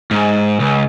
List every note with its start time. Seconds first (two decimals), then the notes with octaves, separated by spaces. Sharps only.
0.11 G#2
0.60 C#2